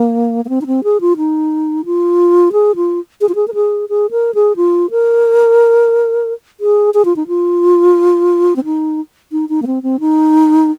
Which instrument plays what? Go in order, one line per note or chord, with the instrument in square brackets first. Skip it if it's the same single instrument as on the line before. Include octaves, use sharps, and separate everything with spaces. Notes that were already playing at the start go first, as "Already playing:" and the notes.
Already playing: [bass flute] A#3
A#3
C4
D#4
C4
G#4
F4
D#4
F4
G#4
F4
G#4
F4
G#4
A#4
G#4
G#4
A#4
G#4
F4
A#4
G#4
G#4
F4
D#4
F4
C4
D#4
D#4
D#4
A#3
C4
C4
D#4